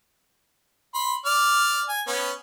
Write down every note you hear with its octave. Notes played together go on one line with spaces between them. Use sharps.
B5 C6
D5 F6
G#5
B3 C#4